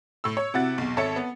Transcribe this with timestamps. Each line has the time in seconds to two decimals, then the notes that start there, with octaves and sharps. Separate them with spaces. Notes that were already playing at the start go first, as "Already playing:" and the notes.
0.24 A2 E6
0.37 C#5
0.54 C3 E4 F#4 F#5 A6
0.78 B1 E2
0.97 G#1 A4 C#5 E5 A5 C#7
1.16 B3